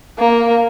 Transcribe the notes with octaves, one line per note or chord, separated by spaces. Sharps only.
A#3